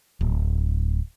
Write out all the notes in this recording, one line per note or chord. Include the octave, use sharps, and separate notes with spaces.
D1